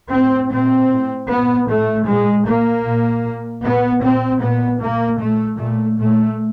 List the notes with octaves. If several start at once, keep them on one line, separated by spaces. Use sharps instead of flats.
A2 C4
A#2 C4
A2
A#2 B3
A2 A3
A#2 G#3
A#2 A#3
A#2
A#2
A#2 B3
A#2 C4
A#2 B3
A#2 A#3
A#2 A3
A#2 A3
A#2 A3